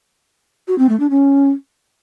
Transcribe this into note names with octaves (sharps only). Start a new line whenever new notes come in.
F#4
C4
A3
D4
C#4